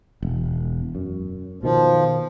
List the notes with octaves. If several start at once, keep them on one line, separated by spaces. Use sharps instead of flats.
E1
F#2
B2 D#3 F3